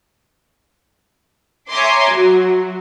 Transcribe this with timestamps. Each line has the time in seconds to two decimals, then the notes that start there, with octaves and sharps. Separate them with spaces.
1.69 C#5 E5 G#5 A#5 C6 D6
2.10 F#3